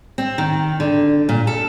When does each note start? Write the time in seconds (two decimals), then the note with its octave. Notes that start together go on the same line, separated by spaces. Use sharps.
0.18 C4
0.38 D#3
0.80 D3
1.29 A#2
1.47 A4